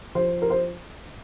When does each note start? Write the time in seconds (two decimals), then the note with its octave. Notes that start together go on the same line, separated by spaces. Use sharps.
0.15 F3 C5
0.42 A#4
0.50 C5